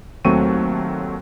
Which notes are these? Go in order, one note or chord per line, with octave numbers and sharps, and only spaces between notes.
D#2 F#3 A3 C4 C#6 D#7